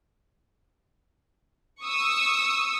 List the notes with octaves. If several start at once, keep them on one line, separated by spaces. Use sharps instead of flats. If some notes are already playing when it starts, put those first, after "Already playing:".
C#6 D#6 E6